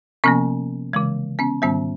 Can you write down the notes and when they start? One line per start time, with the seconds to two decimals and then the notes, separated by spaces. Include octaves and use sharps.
0.24 C3 F3 A#3 B3 C#4
0.93 C#3 E3 G#3
1.39 B3 C#4
1.62 G#2 D#3 G3 B3 C#4